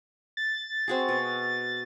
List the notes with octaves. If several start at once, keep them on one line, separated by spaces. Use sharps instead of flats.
A6
C4 F#4 G#4
B2